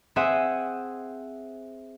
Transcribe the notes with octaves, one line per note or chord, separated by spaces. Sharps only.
C4 G#4 C5 E5 F#5 G#5